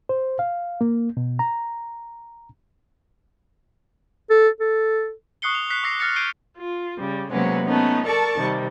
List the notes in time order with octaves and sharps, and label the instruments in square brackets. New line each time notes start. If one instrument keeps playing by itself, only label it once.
[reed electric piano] C5
F5
A#3
B2
A#5
[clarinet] A4
A4
[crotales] C#6 D#6 F#6 C7 C#7 G7
F7
F#6 B6 C7
D6 E6 A#6 C7
D#6 F6 A6 A#6 C#7
F6 G6 C7 D7 D#7 G7
[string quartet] F4
C#3 G3
C3 F#3 G#3 A#3 B3 C#4
A3 B3 C#4 D#4
A4 A#4 D5 A5 C#6
C3 D#3 G3